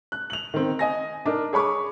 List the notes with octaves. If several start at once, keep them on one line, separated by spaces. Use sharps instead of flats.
F#6
F7 F#7
D#3 C4
D#5 G#5 A#6
D4 D#4 A#4
G#4 C#5 B5 C#6 D6